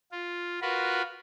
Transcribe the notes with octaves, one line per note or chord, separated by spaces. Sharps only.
F4
F4 F#4 A#4 B4 F5